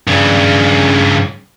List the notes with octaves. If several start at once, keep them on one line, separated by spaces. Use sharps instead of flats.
G2 C#3